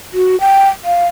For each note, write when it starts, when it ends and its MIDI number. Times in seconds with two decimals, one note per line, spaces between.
0.14 0.39 66
0.40 0.68 79
0.85 1.08 77